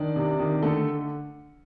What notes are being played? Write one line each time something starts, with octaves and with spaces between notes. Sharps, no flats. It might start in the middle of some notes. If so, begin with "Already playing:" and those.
Already playing: D#3 D4 D5
C3
D#3
D3 A3 A4